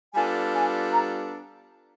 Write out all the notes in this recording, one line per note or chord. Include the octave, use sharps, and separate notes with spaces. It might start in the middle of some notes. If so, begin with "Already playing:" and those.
G3 B3 D4 F4 A4 G#5
G#5
A#5